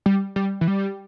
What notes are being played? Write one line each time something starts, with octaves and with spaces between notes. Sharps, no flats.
G3
G3
E3
G3